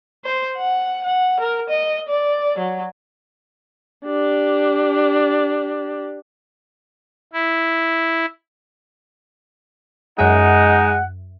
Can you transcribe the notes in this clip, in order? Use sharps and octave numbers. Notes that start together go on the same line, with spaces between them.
C5
F#5
F#5
A#4
D#5
D5
F#3
D4 G4
E4
F#2 G#3 D#4 E5 F#5